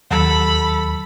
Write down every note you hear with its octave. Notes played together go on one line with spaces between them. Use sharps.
D#2 F#3 A4 B5